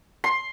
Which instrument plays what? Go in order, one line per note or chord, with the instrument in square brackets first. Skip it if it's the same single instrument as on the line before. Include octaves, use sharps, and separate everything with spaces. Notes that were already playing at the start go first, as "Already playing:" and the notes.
[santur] C6